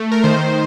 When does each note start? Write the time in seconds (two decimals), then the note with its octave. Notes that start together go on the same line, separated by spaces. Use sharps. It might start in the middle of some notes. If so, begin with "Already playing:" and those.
Already playing: A3
0.12 A#4
0.24 D#3 C5